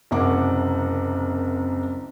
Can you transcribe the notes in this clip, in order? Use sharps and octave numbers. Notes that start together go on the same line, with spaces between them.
F#1 C2 A#3 F#5 D6